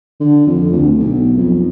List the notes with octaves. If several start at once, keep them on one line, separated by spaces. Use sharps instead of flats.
D3
F2
D2
B1
F2